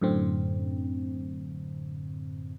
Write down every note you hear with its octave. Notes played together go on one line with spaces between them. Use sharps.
F#2 A2 D3 C4